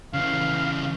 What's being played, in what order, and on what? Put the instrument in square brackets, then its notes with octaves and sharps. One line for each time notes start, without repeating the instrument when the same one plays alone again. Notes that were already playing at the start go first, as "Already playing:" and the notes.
[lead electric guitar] C#3 E3 [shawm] F5